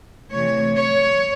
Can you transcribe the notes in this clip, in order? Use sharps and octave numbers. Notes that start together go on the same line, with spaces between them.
C3 E3 A3 C#5
C#5